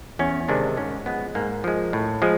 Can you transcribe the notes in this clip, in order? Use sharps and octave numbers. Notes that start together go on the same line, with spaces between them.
E2 C#4
C3 D#3 G#3 D4
G#2 C#4
F3 G#3 B3
G#2 A#3
F3 G#3
A2
F3 G#3